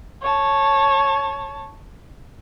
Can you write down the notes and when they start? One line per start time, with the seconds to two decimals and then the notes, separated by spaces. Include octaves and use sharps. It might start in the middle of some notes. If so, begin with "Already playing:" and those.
0.21 C#5 A5